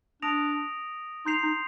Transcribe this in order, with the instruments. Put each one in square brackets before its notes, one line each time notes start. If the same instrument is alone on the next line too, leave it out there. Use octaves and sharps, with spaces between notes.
[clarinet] D4 [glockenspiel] D#6 A#6 D7 F7
[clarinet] D#4 [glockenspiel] C6 G6 C7 F7
[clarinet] D#4